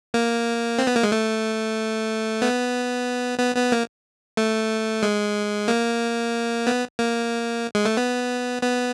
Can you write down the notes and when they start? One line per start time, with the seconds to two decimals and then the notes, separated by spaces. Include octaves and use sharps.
0.14 A#3
0.79 C4
0.87 B3
0.96 A#3
1.03 G#3
1.12 A3
2.42 B3
3.39 B3
3.56 B3
3.72 A#3
4.37 A3
5.03 G#3
5.68 A#3
6.67 B3
6.99 A#3
7.75 G#3
7.85 A3
7.97 B3
8.63 B3